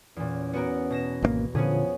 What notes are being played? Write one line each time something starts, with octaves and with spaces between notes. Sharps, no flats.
E2 A#2 C#4
B3 F#4 A#4
B2 A#6 E7
G#1 D#3 A#3
A#2 D3 F3 B3 C#4 G#4